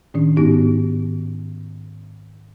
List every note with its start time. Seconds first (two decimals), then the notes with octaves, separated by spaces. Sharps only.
0.14 A2 D#3 C#4 D4
0.37 G#2 B3 D#4 G4